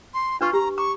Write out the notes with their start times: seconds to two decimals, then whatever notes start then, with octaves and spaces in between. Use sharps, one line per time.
0.14 C6
0.41 D4 F4 B4 C#6
0.53 G4 A#5
0.78 A#5 C#6 D6